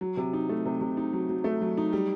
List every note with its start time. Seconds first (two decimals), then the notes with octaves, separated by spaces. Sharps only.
0.01 F#3
0.17 C3
0.33 D#4
0.49 A3
0.65 C3
0.81 C3
0.97 D#4
1.13 F#3
1.29 F#3
1.44 A3
1.61 F#3
1.77 D#4
1.93 G3